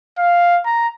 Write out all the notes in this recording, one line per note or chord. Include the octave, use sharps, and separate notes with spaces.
F5
A#5